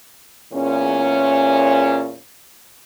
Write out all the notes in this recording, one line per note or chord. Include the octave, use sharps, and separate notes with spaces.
E2 A#2 C#4